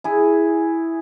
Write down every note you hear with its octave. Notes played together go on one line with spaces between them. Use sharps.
E4 G#4